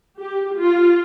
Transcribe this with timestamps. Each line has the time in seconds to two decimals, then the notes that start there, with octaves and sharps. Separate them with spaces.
0.20 G4
0.59 F4